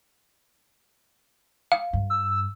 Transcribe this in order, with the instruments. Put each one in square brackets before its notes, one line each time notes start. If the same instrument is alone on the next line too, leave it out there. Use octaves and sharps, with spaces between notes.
[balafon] F5
[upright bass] G2
[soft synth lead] E6